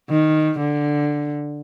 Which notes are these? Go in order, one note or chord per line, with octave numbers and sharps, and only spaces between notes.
D#3
D3